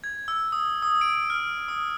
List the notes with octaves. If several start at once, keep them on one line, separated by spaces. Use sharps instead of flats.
G#6
E6
D#6
D#6
D7
F6
D#6